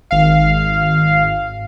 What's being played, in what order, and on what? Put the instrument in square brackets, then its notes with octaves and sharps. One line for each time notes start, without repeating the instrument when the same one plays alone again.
[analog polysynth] G#1 F5